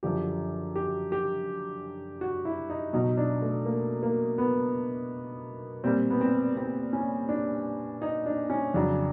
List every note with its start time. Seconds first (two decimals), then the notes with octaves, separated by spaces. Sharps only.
0.03 F#2 D3 F3 G4
0.76 G4
1.12 G4
2.21 F#4
2.45 E4
2.70 D#4
2.93 B2 F#3 D#4
3.17 D4
3.42 A3
3.66 A#3
4.03 A#3
4.38 B3
5.84 A#2 G3 C4
6.10 B3
6.21 C4
6.57 C4
6.93 C#4
7.29 D4
8.02 D#4
8.26 D4
8.50 C#4
8.74 F2 C#3 F#3 D4